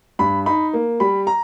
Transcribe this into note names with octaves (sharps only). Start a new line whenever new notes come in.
G2 B5
D#4 B5
A#3
G3 B5
A#5